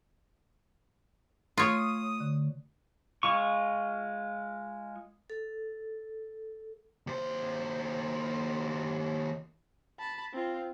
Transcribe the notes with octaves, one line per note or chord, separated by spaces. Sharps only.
A3 F4 C#5 D#6
D3
G#3 F4 C#6
A4
D#2 C5
A5 B5
C4 F4